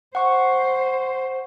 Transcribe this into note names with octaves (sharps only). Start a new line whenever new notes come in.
C5 F#5 C#6